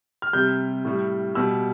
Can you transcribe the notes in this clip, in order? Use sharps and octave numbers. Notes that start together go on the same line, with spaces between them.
F6
C3 G3 G6
A2 G3
B2 G3 E6